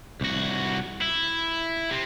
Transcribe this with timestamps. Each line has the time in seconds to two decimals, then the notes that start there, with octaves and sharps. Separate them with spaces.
0.21 C2 F#4
1.02 E4
1.91 C3 C4